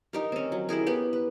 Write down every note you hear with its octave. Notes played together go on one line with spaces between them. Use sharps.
D#4 G4 A#4
C4 C#4
F#3
E4 G4 G#4 A#4
B3 G4
B4